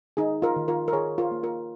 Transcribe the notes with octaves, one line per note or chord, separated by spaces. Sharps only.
D#3 D#4 G#4
F4 A#4
D#3
F4 A#4
A#4
D#3 G#4 C#5
F4 A#4
A#3
F4 A#4